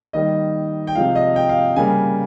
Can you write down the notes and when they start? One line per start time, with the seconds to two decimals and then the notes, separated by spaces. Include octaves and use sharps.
0.13 D#3 G3 A#3 D#5
0.87 G5
0.95 C3 F3 G#3 F5
1.15 D#5
1.36 G5
1.49 F5
1.76 C#3 G3 A#3 G#5